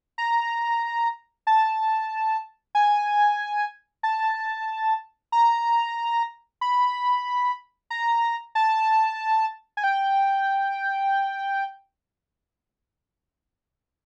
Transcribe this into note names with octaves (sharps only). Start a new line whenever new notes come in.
A#5
A5
G#5
A5
A#5
B5
A#5
A5
G#5
G5